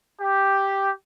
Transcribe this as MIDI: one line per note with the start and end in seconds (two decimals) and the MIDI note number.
0.19 0.90 67